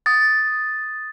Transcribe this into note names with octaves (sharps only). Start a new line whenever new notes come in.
D#6 A6